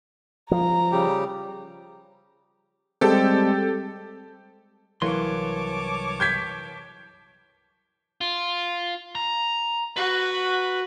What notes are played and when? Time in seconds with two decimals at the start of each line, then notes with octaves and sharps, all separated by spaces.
0.51 F3 A#5
0.92 C#3 G3 G4
3.01 G3 G#3 C4 G4 A4
5.02 C2 E3 F#3 A#3 C#5 A5 C6 D6
6.20 G6 G#6 B6
8.21 F4
9.15 A#5
9.96 F#4 B4